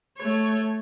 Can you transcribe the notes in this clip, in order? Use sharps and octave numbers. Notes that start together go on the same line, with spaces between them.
A3 C#5